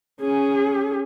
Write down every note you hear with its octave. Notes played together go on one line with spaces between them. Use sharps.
C#4 G#4